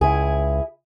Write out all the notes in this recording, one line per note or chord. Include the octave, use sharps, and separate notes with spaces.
C#2 E4 G#4